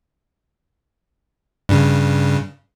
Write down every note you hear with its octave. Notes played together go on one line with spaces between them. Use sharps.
G2 C#3